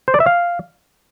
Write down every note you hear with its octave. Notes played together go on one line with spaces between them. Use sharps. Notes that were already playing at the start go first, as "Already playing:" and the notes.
C5
D5
E5
F5